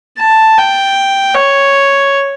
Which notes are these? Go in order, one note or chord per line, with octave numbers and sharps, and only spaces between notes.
A5
G5
C#5